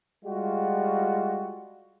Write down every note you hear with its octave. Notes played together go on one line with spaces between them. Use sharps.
G3 G#3 F4 F#4